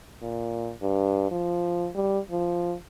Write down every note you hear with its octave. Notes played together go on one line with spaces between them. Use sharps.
A#2
G2
F3
G3
F3